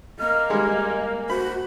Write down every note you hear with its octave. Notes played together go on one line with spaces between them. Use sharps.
A#3 D#5 F6
G3 G#3 G#5
F#4 C5 B5